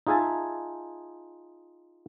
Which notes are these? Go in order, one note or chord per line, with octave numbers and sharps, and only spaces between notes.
D#4 F4 G#4 E5 G#5 A5